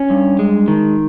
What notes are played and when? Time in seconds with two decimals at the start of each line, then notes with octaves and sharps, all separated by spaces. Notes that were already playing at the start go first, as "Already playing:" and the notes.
Already playing: C#4
0.10 G2
0.39 G#3
0.68 D#3